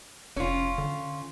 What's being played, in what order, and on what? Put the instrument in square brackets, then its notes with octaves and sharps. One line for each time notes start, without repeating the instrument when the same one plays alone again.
[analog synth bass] F1 [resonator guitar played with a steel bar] C#4 F4
[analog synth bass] D3